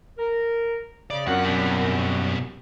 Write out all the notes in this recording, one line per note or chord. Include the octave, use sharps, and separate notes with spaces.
A#4
C#3 D5
F#2 A#2 C4 C#4 F#4 F#5
B2 G3